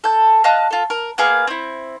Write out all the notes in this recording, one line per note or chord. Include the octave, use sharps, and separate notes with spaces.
A4 G6
D#5 F5 A5 F#6
F4 A4
A#4
A#3 B3 G#4 F5
C4 E4